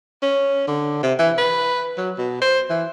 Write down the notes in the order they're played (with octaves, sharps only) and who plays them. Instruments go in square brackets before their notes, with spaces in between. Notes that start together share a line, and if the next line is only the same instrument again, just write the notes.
[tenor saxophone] C#4
D3
C3
E3
B4
F#3
B2
C5
E3